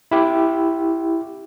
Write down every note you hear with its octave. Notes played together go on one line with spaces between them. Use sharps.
E4 G4